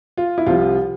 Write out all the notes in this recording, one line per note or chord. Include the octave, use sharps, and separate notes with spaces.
F4
E4
C2 C3 F3 F4